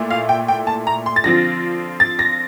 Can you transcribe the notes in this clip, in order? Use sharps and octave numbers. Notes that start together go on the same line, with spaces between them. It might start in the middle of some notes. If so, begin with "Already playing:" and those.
Already playing: A#2 A3 E4
F5
G5
G5
A5
A#5
C6
A6
D3 F3 C4 F4 A#6
A6
A#6